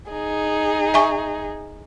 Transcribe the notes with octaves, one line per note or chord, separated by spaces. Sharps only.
D#4 G#4
E5 G#5 C#6